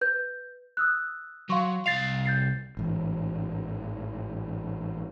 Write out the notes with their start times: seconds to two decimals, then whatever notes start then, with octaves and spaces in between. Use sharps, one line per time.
0.01 B4 G6
0.77 D#6 E6 F#6
1.50 F#3 F5 C6 C#6
1.86 C2 F5 A6 C7 F7
2.26 G6 A6 C7
2.77 A1 G#2 E3